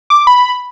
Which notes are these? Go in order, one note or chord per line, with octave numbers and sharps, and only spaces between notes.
D6
B5